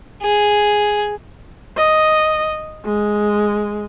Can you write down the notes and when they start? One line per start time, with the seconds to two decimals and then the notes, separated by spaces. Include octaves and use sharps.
0.23 G#4
1.77 D#5
2.85 G#3